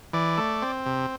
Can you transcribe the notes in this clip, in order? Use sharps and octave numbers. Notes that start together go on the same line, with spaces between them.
E3 D5
A3
C4
C3